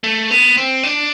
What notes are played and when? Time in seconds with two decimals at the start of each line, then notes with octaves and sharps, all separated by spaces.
0.04 A3
0.31 B3
0.57 C4
0.83 D4